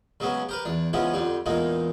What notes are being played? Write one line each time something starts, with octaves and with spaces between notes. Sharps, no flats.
C#3 F#3 G#3 B3 C#4
G4 A#4 B4
E2 D4
C#3 E3 F3 G#3 B3 C#4
F2 D3 G3
E2 A#2 G#3 A#3 D#4